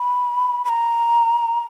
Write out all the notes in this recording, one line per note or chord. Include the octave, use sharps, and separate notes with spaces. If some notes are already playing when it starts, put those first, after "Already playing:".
Already playing: B5
B5
A#5